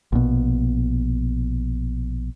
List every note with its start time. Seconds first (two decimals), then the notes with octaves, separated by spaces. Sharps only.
0.12 A#1 B2